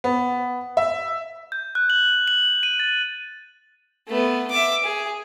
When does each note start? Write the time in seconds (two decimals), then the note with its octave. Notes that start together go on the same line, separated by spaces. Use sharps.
0.04 B3
0.77 E5
1.52 G6
1.75 F#6
1.90 F#7
2.28 F#7
2.63 D#7
2.80 A6
4.08 A3 B3
4.51 E5 D6
4.84 G#4